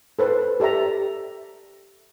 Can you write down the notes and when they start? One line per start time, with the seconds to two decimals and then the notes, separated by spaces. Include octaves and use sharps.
0.19 A4 B4 C5
0.60 G4 A4 D5 E5 A#5